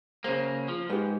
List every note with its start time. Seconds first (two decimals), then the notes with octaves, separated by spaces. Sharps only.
0.24 C#3 A#3 C5
0.68 F3
0.90 G#2 G4 B4